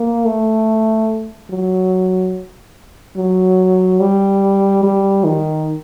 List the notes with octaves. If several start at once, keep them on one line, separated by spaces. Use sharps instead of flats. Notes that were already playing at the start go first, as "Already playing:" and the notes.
Already playing: A#3
A3
F#3
F#3
G3
G3
D#3